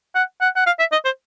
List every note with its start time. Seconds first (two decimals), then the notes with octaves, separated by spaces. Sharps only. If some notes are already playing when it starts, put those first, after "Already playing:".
0.15 F#5
0.41 F#5
0.56 F#5
0.67 F5
0.79 E5
0.92 D#5
1.05 C5